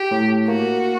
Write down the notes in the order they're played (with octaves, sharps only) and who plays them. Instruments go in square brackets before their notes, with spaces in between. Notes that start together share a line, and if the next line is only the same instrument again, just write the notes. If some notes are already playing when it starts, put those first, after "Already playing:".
Already playing: [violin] G4
[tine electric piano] A2
[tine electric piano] A#3 [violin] F#4